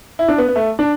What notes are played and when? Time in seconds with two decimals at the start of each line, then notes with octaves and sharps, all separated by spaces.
0.19 E4
0.28 D4
0.38 B3
0.48 B3
0.56 A3
0.79 D4